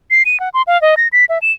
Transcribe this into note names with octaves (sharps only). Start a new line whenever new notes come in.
C7
D#7
F#5
C6
F5
D#5
A#6
B6
E5
E7